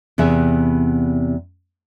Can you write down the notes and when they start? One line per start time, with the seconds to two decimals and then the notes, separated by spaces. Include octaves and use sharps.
0.18 E2 C3 B3 G#4 E5